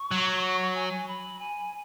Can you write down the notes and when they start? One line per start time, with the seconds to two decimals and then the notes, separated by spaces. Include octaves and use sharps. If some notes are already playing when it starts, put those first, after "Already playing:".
Already playing: C#6
0.11 F#3
0.75 G#5
1.08 B5
1.39 G#5